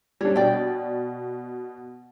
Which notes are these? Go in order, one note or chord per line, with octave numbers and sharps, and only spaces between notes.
G3 D4 C#5
B2 D5 G5